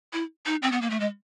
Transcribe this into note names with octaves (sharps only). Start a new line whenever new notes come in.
E4
D#4
C4
B3
A#3
A3
G#3